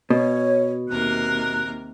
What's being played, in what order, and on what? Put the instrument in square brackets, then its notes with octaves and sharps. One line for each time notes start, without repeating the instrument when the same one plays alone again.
[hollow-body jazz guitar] B2 [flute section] C#5
[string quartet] D#2 C3 A#4 [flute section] F#6